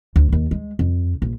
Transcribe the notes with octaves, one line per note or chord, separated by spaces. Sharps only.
D2
D#2
G#3
F2
A#1